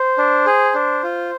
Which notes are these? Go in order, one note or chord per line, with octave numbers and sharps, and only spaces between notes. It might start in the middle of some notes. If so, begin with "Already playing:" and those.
Already playing: C5
D4
G#4
D4
F4